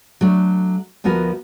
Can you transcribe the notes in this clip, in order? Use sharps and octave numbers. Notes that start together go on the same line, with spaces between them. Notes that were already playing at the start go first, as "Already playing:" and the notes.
F#3 A3 D4
D2 F3 B3 F#4 A#4